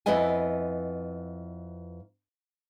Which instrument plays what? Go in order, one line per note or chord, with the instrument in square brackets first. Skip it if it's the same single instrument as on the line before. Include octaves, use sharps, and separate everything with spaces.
[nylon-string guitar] F2 B3 E4 B4 D#5 G#5